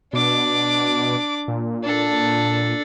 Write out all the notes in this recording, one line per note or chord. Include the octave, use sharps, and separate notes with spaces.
B2 D4 D6
A#2
D4 A4